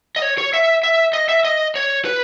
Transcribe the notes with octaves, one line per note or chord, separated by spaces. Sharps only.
D#5
C#5
C#5
E5
E5
D#5
E5
D#5
C#5
B4